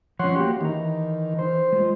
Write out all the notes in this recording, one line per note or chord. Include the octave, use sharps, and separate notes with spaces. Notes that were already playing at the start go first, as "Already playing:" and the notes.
F3 C#4 C#5 F#5 C6
A#3 F#4 G4 C#5
D#3 E3 A#5
C5
G#3 F4